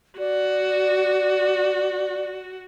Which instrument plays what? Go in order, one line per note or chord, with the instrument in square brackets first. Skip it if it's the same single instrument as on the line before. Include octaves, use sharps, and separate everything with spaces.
[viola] F#4 [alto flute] D5